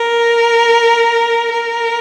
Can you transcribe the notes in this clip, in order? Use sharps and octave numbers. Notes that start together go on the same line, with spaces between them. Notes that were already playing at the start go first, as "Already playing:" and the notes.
Already playing: A#4
A#4